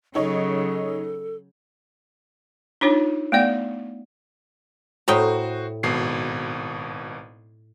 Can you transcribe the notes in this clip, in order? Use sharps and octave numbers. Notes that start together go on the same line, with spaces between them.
C#3 F#3 D#4 A4 C#5 D#5
D4 D#4 F4 C#5
A3 B3 D5 F#5
A2 F#4 C5 G5 A#5 D#6
G#1 B2 C7